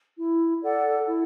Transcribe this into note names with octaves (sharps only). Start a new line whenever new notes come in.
E4
A4 D5 F#5
E4